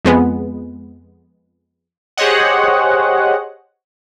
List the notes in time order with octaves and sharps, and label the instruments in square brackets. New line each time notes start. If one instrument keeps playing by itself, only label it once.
[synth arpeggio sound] F2 G#3 B3
[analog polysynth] G4 G#4 C5 C#5 D#5 F#5